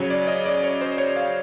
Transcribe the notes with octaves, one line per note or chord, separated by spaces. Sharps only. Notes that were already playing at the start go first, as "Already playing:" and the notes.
Already playing: C#3 F#3 C#5
D5
D#5
D5
C#5
C5
C#5
F5